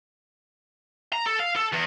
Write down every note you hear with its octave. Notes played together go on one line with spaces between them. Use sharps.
A#5
A4
F5
A4
E2